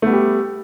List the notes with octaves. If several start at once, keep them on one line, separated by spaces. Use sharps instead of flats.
G3 A3 B3 G4